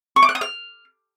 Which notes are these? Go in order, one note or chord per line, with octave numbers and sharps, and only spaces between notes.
C#6
D6
F#6
D#6
F6